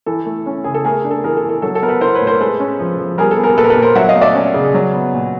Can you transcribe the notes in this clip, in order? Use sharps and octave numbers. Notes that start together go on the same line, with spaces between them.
E3 A4
A3
C#4
C#3 G#4
A4
A3 G#4 A#4
D4
A4
E3 G#4 A#4
A4
E3
A4
F#3 A4
A4
B3 A#4
A4 B4
E4 A#4 C5
B4 C#5
A2
A#4 C5
G#3 A4 B4
C#4
F3
F3
G3 G#4 A#4
A4
B3
G#4 A#4
A#2 A4 B4
A#4
A4 B4
A#2
A#4 C5
F#3 E5 F#5
D#5 F5
A3
D5 E5
C#4
C#3
F#3
B3
A#2